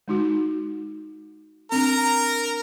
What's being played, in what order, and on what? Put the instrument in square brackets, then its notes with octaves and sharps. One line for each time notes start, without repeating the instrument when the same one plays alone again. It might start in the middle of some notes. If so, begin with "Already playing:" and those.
[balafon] G#3 D#4 F#4
[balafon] C4 D4 [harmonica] A#4 A#5